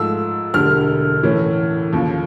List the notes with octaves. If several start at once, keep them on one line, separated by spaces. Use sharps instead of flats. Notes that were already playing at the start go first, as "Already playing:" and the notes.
Already playing: G#2 F3 A3 E6
E1 D2 D3 G3 F6
A2 E3 A3 C#4
D#2 C#3 F3